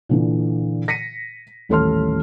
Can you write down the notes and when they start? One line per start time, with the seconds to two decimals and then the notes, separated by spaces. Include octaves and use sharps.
0.09 A#2 D3 E3
0.88 A#6 B6 C#7 D#7
1.69 D#1 A1 A4 A5 C6 F6